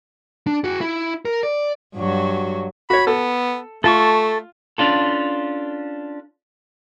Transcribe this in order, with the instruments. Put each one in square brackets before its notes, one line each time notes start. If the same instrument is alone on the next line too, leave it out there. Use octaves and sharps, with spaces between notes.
[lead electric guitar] D4
F#4 G#4
E4
A#4
D5
[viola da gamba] G2 F#3 F#4
[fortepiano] F#4 C#5 [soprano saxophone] B5
[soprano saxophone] B3 [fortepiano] A4
[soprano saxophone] A3 [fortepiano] F4 [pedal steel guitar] A4 A5 C#6
[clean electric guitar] C#4 D4 F4 A4